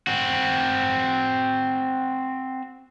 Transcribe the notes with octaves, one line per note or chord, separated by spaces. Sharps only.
C4 F#4